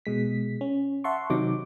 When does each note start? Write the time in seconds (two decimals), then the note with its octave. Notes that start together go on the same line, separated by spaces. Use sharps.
0.06 B2 G#3 B6
0.61 C#4
1.04 E5 F#5 A5 C6 C#6
1.30 C3 D#3 F#3 D#4 D6